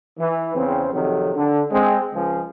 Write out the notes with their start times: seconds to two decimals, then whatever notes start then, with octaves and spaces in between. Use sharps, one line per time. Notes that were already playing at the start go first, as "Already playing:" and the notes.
0.19 E3
0.56 E2 C#3 C4
0.92 F2 C3 D#3 F#3
1.35 D3
1.71 G#3 C4
2.14 C#2 F3 G#3